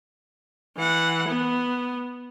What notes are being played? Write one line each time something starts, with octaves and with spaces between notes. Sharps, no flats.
E3 F#5
B3